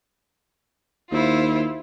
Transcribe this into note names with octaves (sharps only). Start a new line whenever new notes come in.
D#2 E4 F4 C5